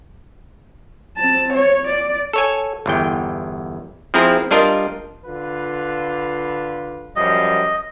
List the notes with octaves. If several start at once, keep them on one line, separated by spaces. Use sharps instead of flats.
C4 A5
C#5
D5
A4 C#5 G#5
G1 E2 G5
F3 C4 E4 G#4 A#5
G3 D4 F4 A#4 D#5
D3 F4 B4
F#2 F3 G3 D#5